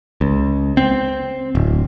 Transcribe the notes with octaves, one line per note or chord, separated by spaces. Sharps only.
C#2
C4
D1